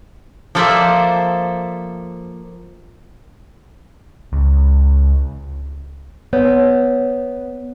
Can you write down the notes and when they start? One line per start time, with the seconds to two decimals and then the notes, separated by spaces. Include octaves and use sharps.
0.55 F3 A#3 A4 C5 D5 E5
4.33 C#2
6.33 B3 C#5